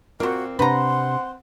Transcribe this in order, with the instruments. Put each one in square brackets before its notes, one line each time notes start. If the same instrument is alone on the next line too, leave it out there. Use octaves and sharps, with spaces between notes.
[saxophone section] A#2 A#3 C4 [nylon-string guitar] F4 [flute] F#4 [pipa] A#4 C5
[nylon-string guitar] C3 D4 [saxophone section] C4 F#5 [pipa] B4 A#5 [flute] C6